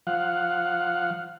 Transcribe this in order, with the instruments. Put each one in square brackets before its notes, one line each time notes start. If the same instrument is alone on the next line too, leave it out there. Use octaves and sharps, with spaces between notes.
[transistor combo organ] F3 F5 F#5